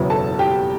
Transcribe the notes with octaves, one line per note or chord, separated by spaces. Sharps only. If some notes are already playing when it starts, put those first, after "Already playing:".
Already playing: F#1 E2 B2 F#3 B3
A4 A5
G4 G5